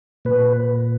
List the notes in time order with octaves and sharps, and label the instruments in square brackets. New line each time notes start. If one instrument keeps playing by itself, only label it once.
[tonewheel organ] A#2 B4